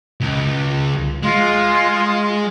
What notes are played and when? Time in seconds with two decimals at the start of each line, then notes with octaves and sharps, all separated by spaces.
0.21 C#2
1.23 G#3 F4